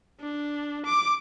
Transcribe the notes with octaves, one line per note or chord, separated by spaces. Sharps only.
D4
D6